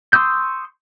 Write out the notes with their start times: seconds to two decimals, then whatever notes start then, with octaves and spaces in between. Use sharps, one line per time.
0.13 C6 C#6 D#6 E6 G6